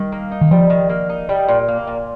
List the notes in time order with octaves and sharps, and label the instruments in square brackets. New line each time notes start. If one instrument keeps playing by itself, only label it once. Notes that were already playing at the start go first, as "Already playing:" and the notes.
Already playing: [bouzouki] D#3 [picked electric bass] G3
[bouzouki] A#3
D#4
[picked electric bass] D#3
[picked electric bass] F3 [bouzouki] G3
[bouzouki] D#3
A#3
D#4
G3
A#2
A#3
A#2